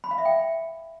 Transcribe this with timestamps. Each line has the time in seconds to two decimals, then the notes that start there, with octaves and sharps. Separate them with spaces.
0.04 B5
0.11 F5
0.18 E5
0.25 G5